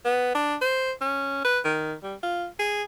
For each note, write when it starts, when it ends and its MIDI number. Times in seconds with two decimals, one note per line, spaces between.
0.05 0.32 59
0.35 0.55 62
0.61 0.92 72
1.01 1.44 61
1.44 1.59 71
1.65 1.95 51
2.03 2.15 55
2.23 2.46 65
2.59 2.82 68